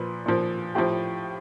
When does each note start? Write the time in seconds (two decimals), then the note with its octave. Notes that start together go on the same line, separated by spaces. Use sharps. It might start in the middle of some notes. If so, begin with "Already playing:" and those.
Already playing: A#2 F3 B4
0.26 A#2 F3
0.75 A2 F3 G4